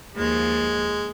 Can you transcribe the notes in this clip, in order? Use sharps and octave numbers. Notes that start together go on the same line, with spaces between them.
D#2 F3 G#3